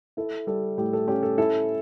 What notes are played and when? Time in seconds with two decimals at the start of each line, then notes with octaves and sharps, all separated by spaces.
0.17 E4 A4
0.47 G3 A4
0.78 A2 G4
0.93 A4
1.08 C#4 G4
1.23 A4
1.38 E4 A4